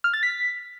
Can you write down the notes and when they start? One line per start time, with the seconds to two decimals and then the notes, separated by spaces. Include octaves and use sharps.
0.04 F6
0.14 A6
0.23 B6